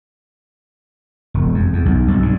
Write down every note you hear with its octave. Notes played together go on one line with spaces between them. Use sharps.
E1
F2
E2
B1
B1
G2